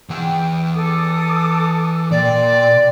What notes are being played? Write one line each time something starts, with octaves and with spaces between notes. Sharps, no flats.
E3 F#5 G5
A4 D6 D#6
A#2 D5 G5 C6